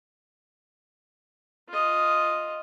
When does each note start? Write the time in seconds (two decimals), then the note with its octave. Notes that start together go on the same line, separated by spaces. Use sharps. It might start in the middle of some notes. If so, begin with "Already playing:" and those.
1.69 F4 D#5